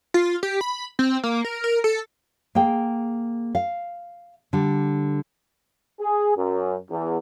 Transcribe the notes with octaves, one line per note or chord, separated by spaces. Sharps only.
F4
G4
B5
C4
A#3
A#4
A#4
A4
A#3 G#4 G5
F5
D3 G3
G#4
F#2
E2